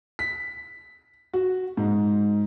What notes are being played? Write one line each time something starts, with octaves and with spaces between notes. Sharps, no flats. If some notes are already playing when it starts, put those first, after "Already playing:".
B6
F#4
G#2